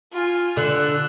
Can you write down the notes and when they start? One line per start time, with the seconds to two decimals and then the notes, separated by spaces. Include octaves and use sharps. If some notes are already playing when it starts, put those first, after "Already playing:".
0.13 F4 G#5
0.57 D3 E6 F#6